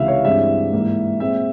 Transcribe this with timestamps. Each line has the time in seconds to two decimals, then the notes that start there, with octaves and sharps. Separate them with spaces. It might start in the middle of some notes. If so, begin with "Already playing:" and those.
Already playing: C#2 C3 E3 E5 F5
0.08 C#5
0.25 G2 E3 G#3 C4 E5
0.73 G#2 E3 A#3
1.20 A#2 G#3 C4 E5